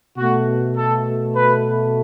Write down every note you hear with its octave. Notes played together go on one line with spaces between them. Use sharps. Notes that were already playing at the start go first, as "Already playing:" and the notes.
B2 A3 F#4
A4
B4